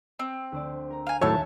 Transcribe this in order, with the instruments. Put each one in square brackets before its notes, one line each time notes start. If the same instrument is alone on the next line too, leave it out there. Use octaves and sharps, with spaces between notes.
[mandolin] C4
[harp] D2 C5 D5
A#4 A#5
[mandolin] F5 G#5
[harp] D#1 D#2 F6 [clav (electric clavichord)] A2 F#3 [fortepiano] C#5 [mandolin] E5 A5